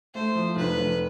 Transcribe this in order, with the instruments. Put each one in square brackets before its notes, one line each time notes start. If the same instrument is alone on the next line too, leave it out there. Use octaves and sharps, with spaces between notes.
[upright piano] A3 [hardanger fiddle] C5
[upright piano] F3
[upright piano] F1 [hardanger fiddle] B4
[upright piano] F1